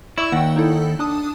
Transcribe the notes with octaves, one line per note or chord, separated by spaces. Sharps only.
E4 D5 C#6 E6
D#2 F#5 G5
D#4 E4 A4
D4 A5 D#6